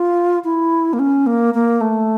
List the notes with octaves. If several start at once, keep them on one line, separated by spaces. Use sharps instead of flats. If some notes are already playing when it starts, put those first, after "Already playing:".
Already playing: F4
E4
A#3
C#4
A#3
A#3
A3